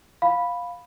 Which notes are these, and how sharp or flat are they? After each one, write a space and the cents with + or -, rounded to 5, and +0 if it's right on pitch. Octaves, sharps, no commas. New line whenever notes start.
F5 +10 B5 +0